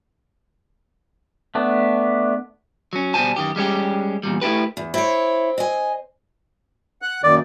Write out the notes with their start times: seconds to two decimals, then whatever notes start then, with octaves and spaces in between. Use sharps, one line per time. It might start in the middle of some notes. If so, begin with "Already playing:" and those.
1.55 A3 B3 D4
2.93 F#3 C#4
3.14 B2 G3 C5 G#5 A5
3.36 F#2 D#3 G4
3.56 G3 G#3 C#4 G4
4.23 E2 A#2 G3
4.41 A3 E4 F4 G4 B4
4.77 E2
4.94 C4 E4 C#5
5.58 D#5 G#5
7.02 F#5 F#6
7.24 F#2 A#2 D#3 D5